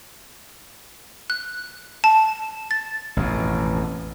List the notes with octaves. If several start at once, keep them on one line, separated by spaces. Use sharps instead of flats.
F#6
A5
A6
A1 F2 B2